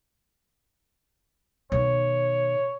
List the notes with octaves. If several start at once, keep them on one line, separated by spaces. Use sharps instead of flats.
B2 D#3 C#5